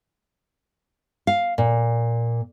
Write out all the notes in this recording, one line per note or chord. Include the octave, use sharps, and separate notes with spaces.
F5
A#2